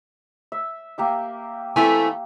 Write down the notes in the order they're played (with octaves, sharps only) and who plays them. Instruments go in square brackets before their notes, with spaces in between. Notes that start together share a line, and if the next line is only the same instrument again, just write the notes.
[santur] E5
A#3 G4 E5
[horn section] E3 A3 [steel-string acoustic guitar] C4 E4 G#5